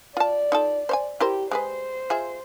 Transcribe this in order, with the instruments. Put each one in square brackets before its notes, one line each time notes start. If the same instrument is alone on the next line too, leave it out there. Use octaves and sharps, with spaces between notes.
[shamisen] F4 A5 [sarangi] D5
[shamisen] D#4 F4 A4
C5 C#5 G#5
[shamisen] E4 A#4 C5 [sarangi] G4
[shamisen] G#3 G#4 B4 [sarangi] C5
[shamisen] F4 G#4 E5